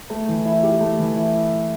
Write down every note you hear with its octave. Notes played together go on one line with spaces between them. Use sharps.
A3
E3
E4
G4
A3
E3
E4